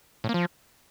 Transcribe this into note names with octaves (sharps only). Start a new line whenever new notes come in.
A2
A#3
F3